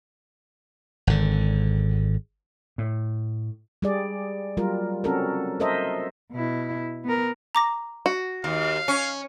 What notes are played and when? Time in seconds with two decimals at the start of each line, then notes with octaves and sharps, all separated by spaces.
1.07 G#1 D3
2.78 A2
3.82 G3 G#4 D5
4.57 F#3 G3 F4 A#4
5.04 C4 C#4 F#4 A4 A#4
5.60 A4 A#4 C5 D#5 E5
6.31 B2 E4
7.04 B3 A#4
7.55 A#5 D6 A#6
8.06 F#4
8.44 D#2 F5
8.88 C#4